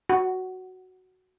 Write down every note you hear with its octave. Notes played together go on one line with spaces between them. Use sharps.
F#4